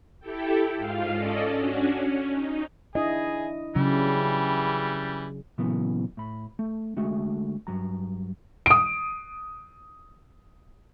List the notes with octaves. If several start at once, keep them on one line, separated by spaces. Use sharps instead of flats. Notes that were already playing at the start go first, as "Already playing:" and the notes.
E4 G4 A4 G5
G#2 F4 F5
C#4 A4 D5 D#5
C#4 D4 F#4
C#4
D#4
D4 E4 G#4 D#5
C#3 E3 F#3 G3
A#2 C#3 E3 F#3 B3
A2 B5
A3
D3 G#3 A3 F#4
G2 F#3 A#5
D#6 D7